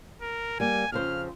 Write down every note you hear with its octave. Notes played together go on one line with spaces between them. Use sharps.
A#4
G3 A#3 G#5
F2 C#3 C5 F6